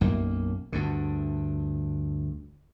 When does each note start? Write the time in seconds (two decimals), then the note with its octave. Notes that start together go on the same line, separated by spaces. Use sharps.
0.01 B1 F#2 A#3
0.72 D2 G2 D3